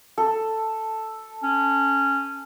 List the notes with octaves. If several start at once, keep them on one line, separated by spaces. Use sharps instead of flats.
A4
C#4